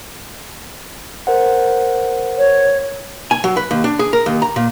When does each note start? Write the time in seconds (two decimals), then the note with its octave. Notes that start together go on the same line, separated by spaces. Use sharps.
1.27 A#4 C5 F#5
2.38 C#5
3.31 G#5
3.44 F#3
3.57 B4
3.71 D#2
3.84 D4
3.99 G#4
4.13 A#4
4.26 D#2
4.42 A#5
4.56 A#2